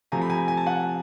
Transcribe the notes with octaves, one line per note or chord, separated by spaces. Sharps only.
C3 F3 A3 G#5 A#5
B5
G#5 A#5
G#5
A5
F#5 G#5